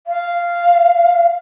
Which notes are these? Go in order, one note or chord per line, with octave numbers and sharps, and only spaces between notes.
F5